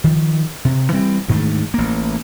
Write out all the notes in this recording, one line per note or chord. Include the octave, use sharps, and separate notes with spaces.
D#3 F3
C3
E3 G3 C4
D2 G#2 D#3 A3
A1 A#3